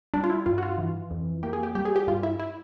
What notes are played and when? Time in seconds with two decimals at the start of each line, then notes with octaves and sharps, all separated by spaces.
0.14 G3 D4
0.24 F4
0.30 E4
0.46 G2 F4
0.58 F#4
0.63 F4
0.78 E3
1.11 F2
1.43 A#3 G4
1.53 G#4
1.63 G4
1.75 G3 G4
1.85 G#4
1.96 G4
2.07 G2 F4
2.23 E4
2.40 E4